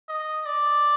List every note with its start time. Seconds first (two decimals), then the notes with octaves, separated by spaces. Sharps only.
0.09 D#5
0.46 D5